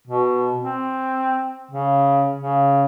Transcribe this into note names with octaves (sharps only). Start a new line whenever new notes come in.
B2
C4
C#3
C#3